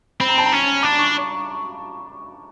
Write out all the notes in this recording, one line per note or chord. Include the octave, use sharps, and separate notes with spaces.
C4 B5
A#5
A5
A#5
C#4
D4 D6
C#6